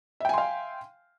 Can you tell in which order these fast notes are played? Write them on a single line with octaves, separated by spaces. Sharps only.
E5 G5 G#5 C6 F5